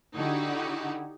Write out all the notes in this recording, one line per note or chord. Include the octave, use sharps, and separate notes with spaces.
D3 D#4 E4 F#4 G4